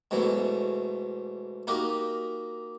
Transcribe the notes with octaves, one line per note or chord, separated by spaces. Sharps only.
G#2 B2 E3 F#3 A3
A#3 D#4 F#4 G4 A#4